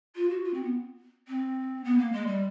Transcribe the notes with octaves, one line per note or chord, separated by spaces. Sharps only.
F4
F#4
F4
C4
B3
C4
B3
A#3
G#3
G3